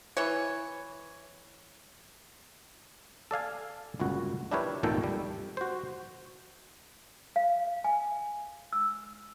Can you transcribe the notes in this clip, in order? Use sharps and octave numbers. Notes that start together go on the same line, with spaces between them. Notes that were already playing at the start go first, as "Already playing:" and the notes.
E3 C#5
A4 D5 F5 G#5
G1 C#2 A#2 F#4
D4 E4 G4 A#4 B4 C#5
G#1 D#2 A#2 D#3 A4 G5
G3
F#4 C5
F5
G#5
E6